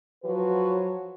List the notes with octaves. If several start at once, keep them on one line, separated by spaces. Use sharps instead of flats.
F3 F#3 F#4 B4